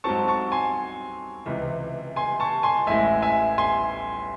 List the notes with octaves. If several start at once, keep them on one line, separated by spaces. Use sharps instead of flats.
G#2 F#3 C4 A5 C#6
A5 C#6
G#5 C6
C#2 C3 E3
G#5 C6
A5 C#6
G#5 C6
A1 A2 G#3 E5 G#5
E5 G#5
G#5 C6